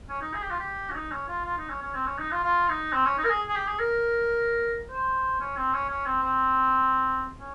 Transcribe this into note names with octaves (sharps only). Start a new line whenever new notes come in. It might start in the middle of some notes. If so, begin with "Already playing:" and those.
C#4
D#4
G#4
G4
F4
G4
C#4
D#4
C#4
F4
F4
D#4
C#4
C#4
C4
C#4
D#4
F4
F4
D#4
C4
C#4
D#4
A#4
G#4
G#4
G4
G#4
A#4
C5
C#4
C4
C#4
C#4
C4
C4
C#4